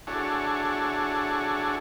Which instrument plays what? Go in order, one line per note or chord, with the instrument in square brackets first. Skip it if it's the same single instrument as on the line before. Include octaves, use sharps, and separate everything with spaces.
[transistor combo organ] D4 E4 F#4 G#4 A4 C#5